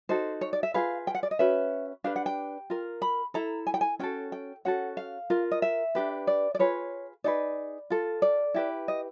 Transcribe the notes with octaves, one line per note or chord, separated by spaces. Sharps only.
D#4 F#4 A4 C5
C#5
D5
E5
F4 G#4 B4 F5
G5
F#5
D5
D#5
C#4 F#4 B4 E5
D4 G4 B4 F5
F#5
G5
F4 A#4
B5
E4 A4 A#5
G#5
G5
G#5
C#4 F#4 A4 G5
G5
C#4 F#4 A4 F#5
F5
F4 A#4
D#5
E5
D4 G4 B4
D5
D5
F4 G#4 B4 C#5
D#4 G#4 B4 D5
F4 A4
D5
E4 G4 B4
D#5